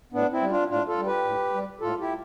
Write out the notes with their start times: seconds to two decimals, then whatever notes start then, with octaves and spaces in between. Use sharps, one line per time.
0.13 A2 B3 D4
0.31 C4 E4
0.41 G3
0.50 D4 F4
0.69 A2 D4 F4
0.87 F4 A4
0.97 G3
1.06 G4 B4
1.25 A2
1.54 G3
1.81 A2 F4 A4
2.00 E4 G4